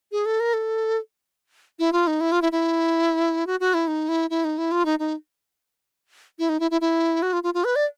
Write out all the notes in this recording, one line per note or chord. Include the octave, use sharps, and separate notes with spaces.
G#4
A4
A#4
A4
E4
F4
D#4
E4
F4
E4
E4
F#4
F#4
E4
D#4
E4
E4
D#4
E4
F4
D#4
D#4
E4
D#4
E4
E4
E4
F#4
F4
F4
F4
B4
D5